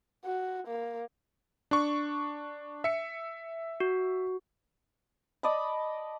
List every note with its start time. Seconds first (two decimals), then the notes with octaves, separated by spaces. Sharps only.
0.25 F#4
0.68 A#3
1.71 D4 C#6
2.84 E5 C#7
3.80 F#4
5.43 D5 D#5 A5 B5